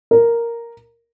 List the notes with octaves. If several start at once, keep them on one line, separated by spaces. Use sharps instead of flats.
A#4